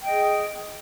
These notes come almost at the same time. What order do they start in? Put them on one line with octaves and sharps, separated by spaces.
G5 D#5 G#4